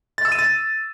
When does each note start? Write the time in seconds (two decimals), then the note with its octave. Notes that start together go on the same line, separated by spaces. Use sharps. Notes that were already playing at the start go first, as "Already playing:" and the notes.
0.18 A6
0.25 E6
0.32 D#7
0.39 A6